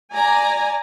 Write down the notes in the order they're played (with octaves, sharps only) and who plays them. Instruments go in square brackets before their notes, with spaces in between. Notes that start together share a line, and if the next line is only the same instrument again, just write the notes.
[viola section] D5 G#5 A#5